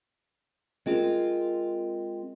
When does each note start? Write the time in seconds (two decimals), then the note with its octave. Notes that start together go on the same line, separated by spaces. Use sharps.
0.86 G#3 C4 F4 G#4 A#4